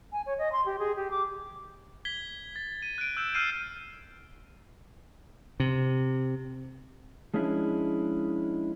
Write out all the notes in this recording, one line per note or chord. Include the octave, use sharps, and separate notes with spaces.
G#5
C#5
D#5
C6
G4
G#4
G4
D6
G#6 B6 G7
A6
D#7
F#6 D7
E6 G6 D7 E7
E6 F6 G6 C7 D#7
C3
F3 G#3 C#4 D4 E4